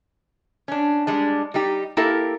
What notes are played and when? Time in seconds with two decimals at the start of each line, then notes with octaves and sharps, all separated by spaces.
0.68 C#4 D4
1.07 G3 G#3 D4
1.54 G3 D#4 G4
1.97 A#3 E4 G4 A4 A#4